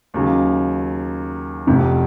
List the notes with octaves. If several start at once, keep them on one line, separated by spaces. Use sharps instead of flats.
D#2 C#3 F#3
F1 F2 C3